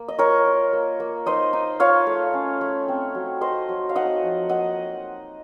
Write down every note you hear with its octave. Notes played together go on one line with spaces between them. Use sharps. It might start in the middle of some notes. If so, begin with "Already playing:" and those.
Already playing: A#3
D#5
F4 A#4 C#5
F4
A#3
A#3
D#4 C5 D#5
D#4
F4 C#5 F5
A3
C#4
A3
C4
F#3
A3 C5 D#5
F#3
F5
D#4 D#5 F#5
F3
A#3 D#5 F#5